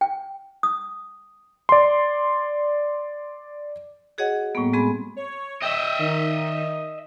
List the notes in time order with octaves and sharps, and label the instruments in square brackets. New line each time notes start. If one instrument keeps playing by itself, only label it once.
[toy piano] G5
D#6
[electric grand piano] D5 C6
[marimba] F#4 G#4 C#5 D#5 F#5
A2 G3 A#3 B3
G#3 C4 G#4 B5
[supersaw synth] C#5
[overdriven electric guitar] D#5 E5 [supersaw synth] G5 E6
[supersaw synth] D#3 D#4